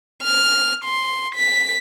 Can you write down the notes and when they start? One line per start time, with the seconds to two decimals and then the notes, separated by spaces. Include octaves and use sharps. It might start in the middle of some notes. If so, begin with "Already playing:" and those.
0.23 F6
0.85 C6
1.36 B6